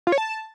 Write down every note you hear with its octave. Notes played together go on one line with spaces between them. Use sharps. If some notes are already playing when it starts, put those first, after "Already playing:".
F4
C#5
A5